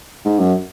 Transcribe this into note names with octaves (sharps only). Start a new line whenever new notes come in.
G#2
F#2